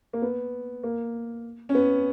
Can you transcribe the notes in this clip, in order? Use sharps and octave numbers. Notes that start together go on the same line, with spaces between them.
A#3
B3
A#3
C#4
B3